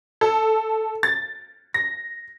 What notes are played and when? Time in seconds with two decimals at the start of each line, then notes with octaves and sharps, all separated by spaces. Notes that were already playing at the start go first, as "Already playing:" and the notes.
0.21 A4
1.03 A6
1.74 A#6